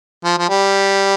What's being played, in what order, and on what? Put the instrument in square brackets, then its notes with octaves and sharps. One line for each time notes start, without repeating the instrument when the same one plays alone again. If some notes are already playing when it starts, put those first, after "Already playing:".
[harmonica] F3
F3
G3